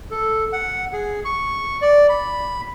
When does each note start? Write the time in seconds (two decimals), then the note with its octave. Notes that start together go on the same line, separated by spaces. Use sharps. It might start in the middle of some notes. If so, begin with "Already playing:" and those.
0.11 A4
0.53 F#5
0.93 G#4
1.25 C#6
1.81 D5
2.09 B5